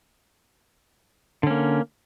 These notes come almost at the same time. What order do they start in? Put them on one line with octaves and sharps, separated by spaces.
D3 C#4 A#3